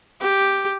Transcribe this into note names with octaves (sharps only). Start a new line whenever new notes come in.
G4